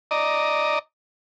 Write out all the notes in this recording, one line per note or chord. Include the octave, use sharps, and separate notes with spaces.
D5 D#5 A#5